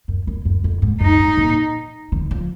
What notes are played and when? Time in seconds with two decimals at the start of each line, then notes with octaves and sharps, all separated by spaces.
0.08 F#2
0.27 F#2
0.45 F#2
0.64 F2
0.82 G#2
1.00 F#2 D#4
1.19 G#2
1.37 A#2
2.12 D#3
2.31 F3